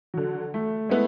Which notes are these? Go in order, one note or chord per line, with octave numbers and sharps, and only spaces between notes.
D3 F#3
A3
G#3 A3 B3 E4